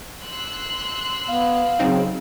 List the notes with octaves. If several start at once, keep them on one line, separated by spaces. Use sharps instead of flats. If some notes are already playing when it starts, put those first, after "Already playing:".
C6 E6 F#6
B3 F5
C#3 F#3 C4 D#4